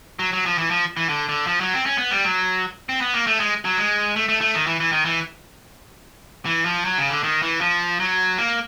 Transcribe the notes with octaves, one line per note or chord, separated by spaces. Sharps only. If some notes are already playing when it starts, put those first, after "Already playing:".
F#3
F#3
F3
E3
F3
E3
D3
D3
F3
F#3
C4
C#4
B3
G3
F#3
C4
B3
A#3
A3
G#3
F#3
G#3
A3
A3
A3
D#3
E3
E3
D#3
E3
E3
F3
F#3
C#3
D3
D#3
E3
F3
F#3
A#3